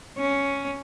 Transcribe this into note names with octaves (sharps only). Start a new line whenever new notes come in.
C#4